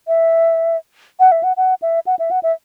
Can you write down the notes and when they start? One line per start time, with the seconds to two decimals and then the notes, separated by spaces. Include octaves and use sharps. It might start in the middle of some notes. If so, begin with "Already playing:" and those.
0.08 E5
1.20 F#5
1.32 E5
1.43 F#5
1.57 F#5
1.82 E5
2.06 F#5
2.19 E5
2.31 F#5
2.43 E5